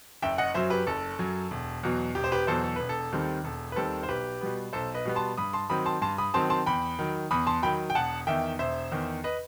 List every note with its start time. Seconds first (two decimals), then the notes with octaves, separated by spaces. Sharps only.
0.22 F#1 E5 G5
0.38 D#5 F#5
0.54 F#2 F#3 C5 E5
0.70 G4 B4
0.87 F#1 A4
1.19 F#2 F#3
1.51 E1
1.83 E2 B2 F#3
2.15 E1 G4
2.24 C5
2.32 G4 B4
2.47 E2 B2 F#3 A4 C5
2.64 A4
2.76 E1 B4
2.89 A4
3.12 D#2 D#3 G3 C4
3.44 E1 A4
3.72 B4
3.76 D#2 D#3 G3 C4 A4
4.03 C5
4.09 B1 G4 B4
4.41 B2 G3 B3
4.73 B1 A4 C5
4.94 B4 D#5
5.05 B2 G3 B3
5.16 A5 C6
5.37 G2 B5 D#6
5.53 A5 C6
5.70 D#3 F#3 C4 B5 D#6
5.86 A5 C6
6.02 G2 A5 C6
6.18 B5 D#6
6.34 D#3 F#3 C4 A5 C6
6.50 A5 C6
6.66 E2 G5 B5
6.99 D#3 F#3
7.31 E2 B5 D#6
7.47 A5 C6
7.63 D#3 F#3 G5 B5
7.90 G5
7.95 E1 F#5 A5
8.27 E2 D#3 E5 G5
8.59 E1 C5 E5
8.92 E2 D#3
9.24 B4 D#5